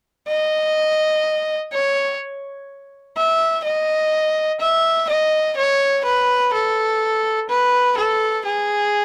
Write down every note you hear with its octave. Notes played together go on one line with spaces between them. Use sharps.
D#5
C#5
E5
D#5
E5
D#5
C#5
B4
A4
B4
A4
G#4